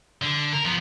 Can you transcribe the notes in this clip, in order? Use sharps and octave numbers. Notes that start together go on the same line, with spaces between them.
D3
A#4
F3 B3